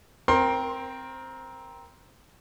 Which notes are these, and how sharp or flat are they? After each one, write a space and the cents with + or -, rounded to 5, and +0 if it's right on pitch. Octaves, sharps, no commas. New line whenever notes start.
C4 +0 A#4 +15 C6 +25